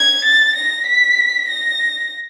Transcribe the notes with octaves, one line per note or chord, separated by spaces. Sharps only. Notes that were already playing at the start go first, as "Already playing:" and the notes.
Already playing: G#6
A6
A#6
B6
A#6